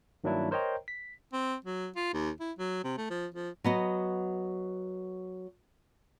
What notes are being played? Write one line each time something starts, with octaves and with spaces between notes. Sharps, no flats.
G2 D#3 F#3 A#3 D4 E4
A#4 C5 C#5 D#5 G5 A#5
B6
C4
F#3
F4
D#2
E4
F#3
C3
A3
F3
F3
F#3 B3 D#5